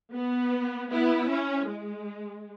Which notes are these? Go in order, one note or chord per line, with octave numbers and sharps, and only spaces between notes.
B3
B3 E4
C#4
G#3